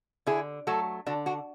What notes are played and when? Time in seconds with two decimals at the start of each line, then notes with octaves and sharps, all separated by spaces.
0.27 D3 E4 G#4
0.67 F#3 A3 F#4 A4
1.06 D3 D4 F#4
1.26 D4 F#4